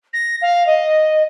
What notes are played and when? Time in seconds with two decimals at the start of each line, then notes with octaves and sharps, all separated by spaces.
0.13 A#6
0.42 F5
0.67 D#5